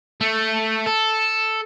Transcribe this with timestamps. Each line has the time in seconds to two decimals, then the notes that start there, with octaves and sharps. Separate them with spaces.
0.21 A3
0.87 A4